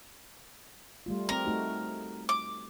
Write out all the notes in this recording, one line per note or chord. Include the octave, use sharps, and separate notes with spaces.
G3 A3 F4
C4 G4 A#4
A3 D#4 F#4
D6